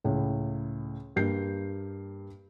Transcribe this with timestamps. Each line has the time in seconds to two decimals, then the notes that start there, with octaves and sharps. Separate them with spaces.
0.04 C#2 A2
1.16 G2 A#3 G6 C7